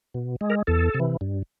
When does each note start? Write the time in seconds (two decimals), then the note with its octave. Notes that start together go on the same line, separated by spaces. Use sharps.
0.14 B2
0.41 G#3
0.50 A#4
0.67 E2 A4
0.95 C3
1.00 E3
1.21 G2